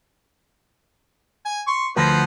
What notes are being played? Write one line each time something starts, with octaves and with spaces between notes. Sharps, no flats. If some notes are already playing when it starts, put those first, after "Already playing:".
G#5
C6 C#6
D2 F3 B3 A#4 C5